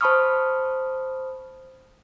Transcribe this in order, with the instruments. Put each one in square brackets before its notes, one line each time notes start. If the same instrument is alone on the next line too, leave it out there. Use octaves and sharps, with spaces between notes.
[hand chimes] C5 A5 B5 C#6 D#6 F6